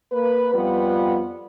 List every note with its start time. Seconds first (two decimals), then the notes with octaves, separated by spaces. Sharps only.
0.12 A#3 B4
0.53 F2 G3 B3 F4 B4